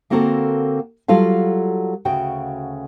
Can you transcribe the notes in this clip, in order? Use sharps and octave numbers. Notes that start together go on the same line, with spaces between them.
D3 A#3 C4 F#4 A4 A#4
F#3 G3 F4 A4 F5
D2 C#3 F#4 G5